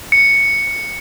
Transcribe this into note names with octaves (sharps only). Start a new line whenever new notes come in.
C#7